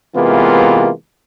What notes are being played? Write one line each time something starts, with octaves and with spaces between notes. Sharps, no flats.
C3 E3 G#3 A#3 B3 F4